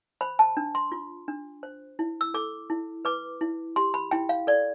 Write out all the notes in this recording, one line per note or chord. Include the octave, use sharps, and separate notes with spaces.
C5 B5
A5
D4
C6
F4
D4
C5
E4
E6
A4 D6
E4
B4 D6
E4
G4 C6
B5
E4 G5
F5
A4 D5